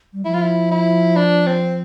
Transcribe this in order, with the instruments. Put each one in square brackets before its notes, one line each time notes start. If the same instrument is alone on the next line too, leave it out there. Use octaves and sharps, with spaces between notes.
[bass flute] G3
[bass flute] F3 [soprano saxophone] E4
[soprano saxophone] F4
E4
E4
D4
C4